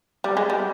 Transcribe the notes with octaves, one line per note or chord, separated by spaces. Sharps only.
G3
G#3
G3